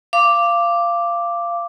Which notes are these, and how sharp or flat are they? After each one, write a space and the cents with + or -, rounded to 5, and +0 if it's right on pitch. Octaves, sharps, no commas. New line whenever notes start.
F5 -20 D6 +0